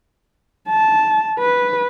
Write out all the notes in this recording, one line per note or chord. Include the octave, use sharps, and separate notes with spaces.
A5
B4